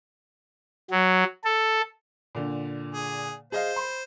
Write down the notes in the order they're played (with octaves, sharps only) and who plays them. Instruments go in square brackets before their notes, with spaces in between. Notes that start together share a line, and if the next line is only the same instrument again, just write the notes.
[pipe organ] F#3
A4
[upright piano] A#2 D3
[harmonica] G#4
[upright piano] G#4 D#5 F5 [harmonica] C5
[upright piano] B5 C6